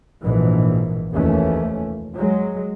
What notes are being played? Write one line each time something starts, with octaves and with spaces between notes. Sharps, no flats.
A#1 G#2 B2 E3
F1 D#2 E3 F3 A3 C#4
F#3 G#3